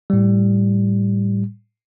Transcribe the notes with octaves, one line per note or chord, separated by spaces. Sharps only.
A2 G3